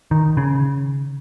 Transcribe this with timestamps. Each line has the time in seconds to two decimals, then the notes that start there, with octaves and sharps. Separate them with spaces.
0.11 D#3
0.37 C#3